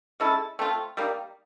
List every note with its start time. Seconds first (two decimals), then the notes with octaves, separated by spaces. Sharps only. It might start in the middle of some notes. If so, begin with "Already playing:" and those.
0.20 G#3 C#4 E4 A4
0.59 A3 C4 F4
0.97 G3 A#3 D#4